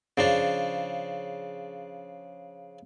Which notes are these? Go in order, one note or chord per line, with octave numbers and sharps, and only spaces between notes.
C#3 F3 D4